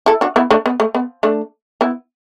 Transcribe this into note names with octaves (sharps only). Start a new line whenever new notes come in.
E4 A4
D4 F#4
B3 E4
A3 D4
B3
A3
B3
A3 D4
B3 E4